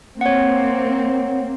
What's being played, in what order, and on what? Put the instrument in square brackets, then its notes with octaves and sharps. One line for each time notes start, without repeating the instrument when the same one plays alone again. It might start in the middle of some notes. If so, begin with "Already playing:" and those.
[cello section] A#3 C4 [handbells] C#5 F#5